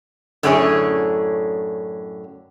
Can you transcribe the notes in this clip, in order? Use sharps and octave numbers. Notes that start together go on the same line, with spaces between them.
F#2 A2 D3 C#4 G#4 C#5